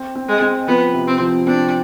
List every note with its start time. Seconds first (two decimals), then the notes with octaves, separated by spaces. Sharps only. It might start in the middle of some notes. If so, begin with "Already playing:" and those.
Already playing: C4
0.16 C4
0.28 G#3
0.42 C4
0.68 F3 B3
0.94 C3
1.07 C4
1.20 F3
1.47 C4 D4